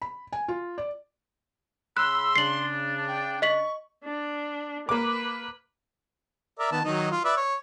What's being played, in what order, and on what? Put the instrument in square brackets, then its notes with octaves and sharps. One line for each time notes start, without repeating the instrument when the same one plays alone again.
[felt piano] B5
G#5
F4
D5
[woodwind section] C#3 B5 E6 [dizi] C6 [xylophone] F#6
[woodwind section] C#3 D4 [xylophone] C7 F#7
[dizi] G5
[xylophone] D#5 B6 F#7 [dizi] C#6
[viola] D4
[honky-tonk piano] A#3 D6 [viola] B4
[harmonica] A#4 D5 E5
D#3 B3 A5
D#3 F#3 D#4
F4
B4 D5 E5
C#5